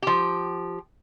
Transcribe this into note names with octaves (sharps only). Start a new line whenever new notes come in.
F3 G4